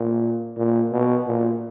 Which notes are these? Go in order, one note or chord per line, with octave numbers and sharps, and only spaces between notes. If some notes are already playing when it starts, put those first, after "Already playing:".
Already playing: A#2
A#2
B2
A#2